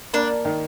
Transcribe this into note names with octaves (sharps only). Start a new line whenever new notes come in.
A#3 D4
D#3